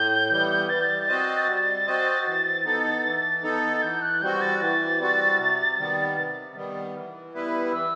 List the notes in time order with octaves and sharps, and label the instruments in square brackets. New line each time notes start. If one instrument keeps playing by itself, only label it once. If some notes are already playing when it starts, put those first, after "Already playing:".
Already playing: [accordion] A2 [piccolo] G6
[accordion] E3 G3 B3
[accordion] G3 [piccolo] A6
[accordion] C4 F#4 C5 D#5
G3
C4 F#4 C5 D#5
E3
B3 D#4 A4
E3
B3 D#4 A4
[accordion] E3 [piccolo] G6
[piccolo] F#6
[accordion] G3 C4 F#4 [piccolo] G6
[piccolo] A6
[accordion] E3 [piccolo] A6
[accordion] G3 C4 F#4
C3
D#3 G3 B3
C3
D#3 G3 B3
E3
G3 B3 E4 B4
[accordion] E3 [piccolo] E6